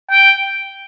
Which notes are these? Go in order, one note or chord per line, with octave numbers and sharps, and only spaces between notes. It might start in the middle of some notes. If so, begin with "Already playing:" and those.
G5